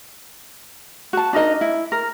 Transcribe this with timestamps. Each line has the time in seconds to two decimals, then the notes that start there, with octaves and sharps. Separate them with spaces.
1.13 F#4 A5
1.33 D4 D#4 A#4 D#5
1.61 E4
1.92 A#4